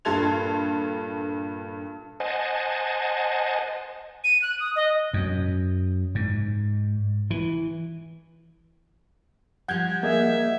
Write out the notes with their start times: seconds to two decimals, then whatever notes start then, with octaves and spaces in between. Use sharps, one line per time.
0.05 G2 A#2 A4 C6 G#6 F7
2.20 C5 D#5 F#5 G#5 A5
4.24 D#7
4.42 F#6
4.60 D#6
4.76 D#5
5.13 F#2
6.15 G#2
7.31 E3
9.68 F3 G3 F#5 G6 G#6
10.03 A#3 G#4 D#5 E5